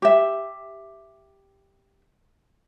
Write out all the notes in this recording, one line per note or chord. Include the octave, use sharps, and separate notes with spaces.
G4 E5